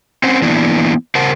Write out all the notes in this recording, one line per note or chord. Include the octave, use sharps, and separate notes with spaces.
C4 C#4 C5 F#5
E3 A#3 B3 D4 E4
C#3 A#4 C5 F#5 A5